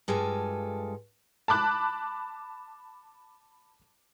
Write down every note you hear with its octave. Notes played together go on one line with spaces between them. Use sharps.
G2 G#3 F4 A4 G#5
A5 B5 D6 F#6